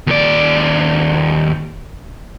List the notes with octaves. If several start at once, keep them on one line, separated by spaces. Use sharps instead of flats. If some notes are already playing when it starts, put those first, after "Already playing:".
D#2 D5